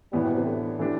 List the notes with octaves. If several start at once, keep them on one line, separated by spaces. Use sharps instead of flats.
A2 E3 G3 B3
B2
C3
D3
E3 A3 D4 G4